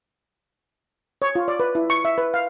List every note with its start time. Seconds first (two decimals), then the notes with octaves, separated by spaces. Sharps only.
1.22 C#5
1.35 F4
1.48 D5
1.60 B4
1.75 E4
1.90 C#6
2.05 E5
2.18 B4
2.34 F5